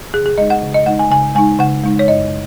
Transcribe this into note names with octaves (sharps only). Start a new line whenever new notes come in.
C#3 G#4
G#4
G#3 D#4 D#5
F#5
C#3
D#5
G#3 D#4 F#5
G#5
C#3 G#5
G#3 D#4 G#5
C#3 F#5
G#3 D#4
C#5
F#2 D#5